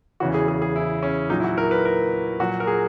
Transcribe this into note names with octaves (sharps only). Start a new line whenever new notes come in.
E2 C#3 E3 F#4
G#4
G#4
G#4
E4
C#4
A#2 F#3 D#4
E4
F#4
A#4
B4
A#4
A#2 F#3 F#4
A#4
G#4